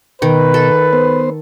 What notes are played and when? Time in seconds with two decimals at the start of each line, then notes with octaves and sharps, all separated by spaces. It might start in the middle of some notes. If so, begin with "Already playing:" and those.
0.22 B2 D#3 B4
0.54 A4
0.93 B3 C5